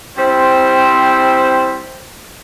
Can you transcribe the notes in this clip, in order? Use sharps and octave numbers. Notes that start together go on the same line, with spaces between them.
G3 C4 E4 C5